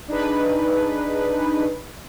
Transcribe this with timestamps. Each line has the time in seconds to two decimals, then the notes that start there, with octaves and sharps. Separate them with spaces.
0.08 D4 D#4 G#4 B4